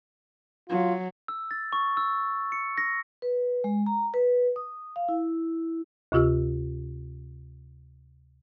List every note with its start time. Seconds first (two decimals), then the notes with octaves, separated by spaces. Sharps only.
0.70 F#3 F4
1.28 E6
1.51 A6
1.73 C#6
1.97 E6
2.52 C#7
2.78 A#6
3.22 B4
3.64 G#3
3.86 A#5
4.14 B4
4.56 D#6
4.96 F5
5.09 E4
6.12 D2 C3 F4 G4 E6